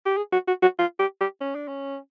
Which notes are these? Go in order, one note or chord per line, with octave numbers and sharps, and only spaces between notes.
G4
G#4
F#4
F#4
F#4
F4
G4
G4
C#4
D4
C#4